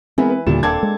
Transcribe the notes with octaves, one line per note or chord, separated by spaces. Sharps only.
E3 G#3 B3 C4 A#4
B4
D#2 A#2 D3 G3 E7
D#1 A#3 C4 D4 A4 A5 G#6
G#3